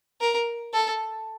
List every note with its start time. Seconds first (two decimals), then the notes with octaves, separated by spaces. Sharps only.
0.21 A#4
0.74 A4